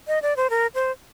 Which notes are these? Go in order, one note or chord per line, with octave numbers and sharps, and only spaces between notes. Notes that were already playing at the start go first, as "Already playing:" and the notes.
D#5
D5
C5
A#4
C5